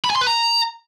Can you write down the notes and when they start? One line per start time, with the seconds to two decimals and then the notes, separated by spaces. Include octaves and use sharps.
0.05 B5
0.10 G#5
0.16 C6
0.21 B4
0.27 A#5